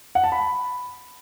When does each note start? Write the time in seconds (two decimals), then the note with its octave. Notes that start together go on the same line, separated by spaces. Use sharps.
0.15 F#5
0.24 A5
0.32 B5